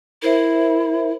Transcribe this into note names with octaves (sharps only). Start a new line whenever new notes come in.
E4 A#4 C5 E5